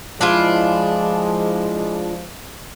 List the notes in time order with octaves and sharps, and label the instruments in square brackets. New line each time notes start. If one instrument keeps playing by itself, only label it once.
[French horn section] F3 G#3 [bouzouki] D4 E4 F4